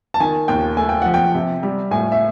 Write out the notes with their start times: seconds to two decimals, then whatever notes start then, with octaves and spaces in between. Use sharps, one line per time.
0.14 A5
0.20 D#3 G#5
0.48 D#2 G5
0.77 A3 G#5
0.89 G5
1.02 F3 F#5
1.14 G5
1.34 C3
1.63 G3
1.91 A2 G#5
2.12 E5